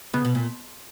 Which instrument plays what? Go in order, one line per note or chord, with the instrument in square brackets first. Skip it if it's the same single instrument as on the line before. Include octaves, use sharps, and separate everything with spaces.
[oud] C#3 [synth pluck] B3
[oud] B2
A#2